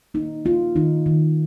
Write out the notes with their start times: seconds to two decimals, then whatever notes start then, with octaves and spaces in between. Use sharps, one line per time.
0.14 A#3 D#4
0.45 A#3 F4
0.76 D#3 D#4
1.06 D#3